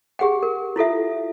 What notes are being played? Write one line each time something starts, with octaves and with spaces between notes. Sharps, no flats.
G4 G#4 F#5 G5
A#4
E4 F4 A4 E5